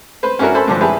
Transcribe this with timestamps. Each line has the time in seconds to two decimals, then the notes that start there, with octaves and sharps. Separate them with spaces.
0.23 B4 C5
0.39 C#4 D4 E4 F#4 A#4
0.54 A4 C5 G#5 B5
0.68 G2 D3 F3
0.81 E4 G4 G#4 B4